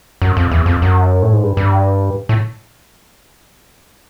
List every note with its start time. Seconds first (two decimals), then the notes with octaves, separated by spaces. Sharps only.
0.22 F#2
0.37 F2
0.51 E2
0.66 F2
0.82 F#2
1.22 A2
1.33 G#2
1.43 G2
1.57 G2
2.29 A2